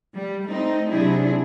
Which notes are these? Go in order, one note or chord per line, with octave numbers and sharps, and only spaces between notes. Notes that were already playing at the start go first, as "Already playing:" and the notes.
G3
A3 C4 D#4
C3 F#3 D4 E4 G#4